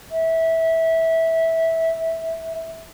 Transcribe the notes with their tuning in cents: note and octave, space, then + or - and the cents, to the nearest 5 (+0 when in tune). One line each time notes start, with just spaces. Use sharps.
E5 -15